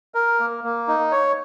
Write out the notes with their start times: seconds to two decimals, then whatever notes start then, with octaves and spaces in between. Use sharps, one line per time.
0.14 A#4
0.40 A#3
0.64 A#3
0.88 D#4
1.12 C#5